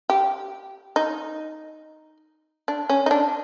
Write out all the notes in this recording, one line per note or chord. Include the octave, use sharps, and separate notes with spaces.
G4
D#4
D4
C#4
D#4
D4